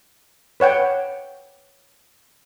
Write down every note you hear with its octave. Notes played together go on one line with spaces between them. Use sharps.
B4 C#5 F#5 G5